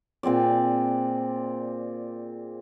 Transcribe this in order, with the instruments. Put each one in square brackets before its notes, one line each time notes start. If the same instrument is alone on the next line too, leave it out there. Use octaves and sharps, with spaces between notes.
[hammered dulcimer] A#2 C4 G#4 D5